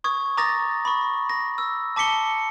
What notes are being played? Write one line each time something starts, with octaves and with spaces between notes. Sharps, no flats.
C#6 D#6 G#6
A#5 D6 D#6 A6 A#6
B5 C#6
A#6
E6
A5 D6 B6 C#7 G7